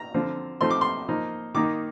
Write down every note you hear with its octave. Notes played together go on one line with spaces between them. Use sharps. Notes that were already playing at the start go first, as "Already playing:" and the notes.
Already playing: A#5
D3 F3 C4 F4
F3 A3 C4 D#4 C6
D6
C6
F3 A#3 D#4
D#3 A#3 D#4 D6